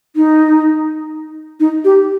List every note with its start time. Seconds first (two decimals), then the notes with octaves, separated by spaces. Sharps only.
0.16 D#4
1.60 D#4
1.84 G4